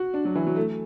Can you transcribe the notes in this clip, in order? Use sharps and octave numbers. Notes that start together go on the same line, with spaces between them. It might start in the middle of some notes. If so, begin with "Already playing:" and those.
Already playing: F#4
D4
F#3
E3
F#3
A3